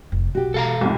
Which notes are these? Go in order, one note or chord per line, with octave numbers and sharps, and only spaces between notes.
F1
B1 F#4 G4
B2 E3 A4 F5 A#5
C2 F2 G#2 F4